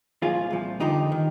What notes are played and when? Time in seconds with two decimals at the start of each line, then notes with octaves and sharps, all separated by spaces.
0.22 C2 A#2 F3 F4 G#4
0.50 C2 A#2 F3
0.80 F2 D3 F3 D#4 G4
1.12 D#3